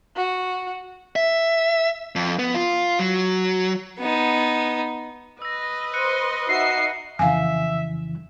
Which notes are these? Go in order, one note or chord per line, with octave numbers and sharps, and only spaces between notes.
F#4
E5
F2
B3
F4
F#3
B3 D#4
B4 D#5 E6 A#6
C5 C6 F#6 C#7 D#7
D#4 F#4 E5 C7
F2 C#3 E3 E5 F5 G#5